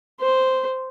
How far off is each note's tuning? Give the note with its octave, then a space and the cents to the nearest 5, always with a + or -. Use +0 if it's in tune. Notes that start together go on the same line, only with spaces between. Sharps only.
C5 -5